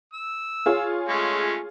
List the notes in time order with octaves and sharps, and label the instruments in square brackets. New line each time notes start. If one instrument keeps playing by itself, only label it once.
[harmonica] E6
[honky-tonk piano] F4 G#4 C#5
[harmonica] G#3 A3 C#4